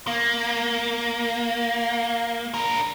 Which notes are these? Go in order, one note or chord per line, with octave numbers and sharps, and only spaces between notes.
A#3
D4 A#4